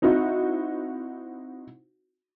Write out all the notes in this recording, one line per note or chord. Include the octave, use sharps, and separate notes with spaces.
C4 D#4 E4 F#4